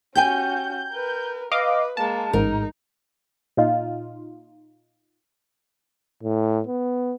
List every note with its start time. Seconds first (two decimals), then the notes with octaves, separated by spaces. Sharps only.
0.15 C#4 F#4 G4 G5 G#5 G6
0.93 A#4 B4
1.52 B4 D#5 F5 D6
1.97 G#3 A#3 A5
2.33 A1 G#2 D#4 A#4
3.57 A#2 D#4 F4
6.23 A2
6.67 B3